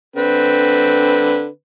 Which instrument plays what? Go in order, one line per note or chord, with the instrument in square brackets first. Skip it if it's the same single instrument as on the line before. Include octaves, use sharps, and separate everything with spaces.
[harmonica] D3 C4 B4